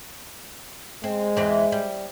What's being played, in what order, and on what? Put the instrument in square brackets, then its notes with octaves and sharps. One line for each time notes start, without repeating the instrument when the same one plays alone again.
[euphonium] G#3 [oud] C4
[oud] E2 E3 C4
G3